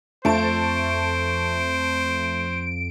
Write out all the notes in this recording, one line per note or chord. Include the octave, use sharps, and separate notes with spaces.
F2 A3 C5 A5 D7